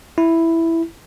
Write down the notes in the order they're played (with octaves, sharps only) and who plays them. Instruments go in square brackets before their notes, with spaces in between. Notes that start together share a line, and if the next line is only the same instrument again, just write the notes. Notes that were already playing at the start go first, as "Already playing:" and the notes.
[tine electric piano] E4